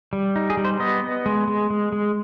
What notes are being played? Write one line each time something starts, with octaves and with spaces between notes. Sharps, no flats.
G3
D#4
G#4
G3
C5
B3 D#5
B3
G#3
G#3
G#3
G#3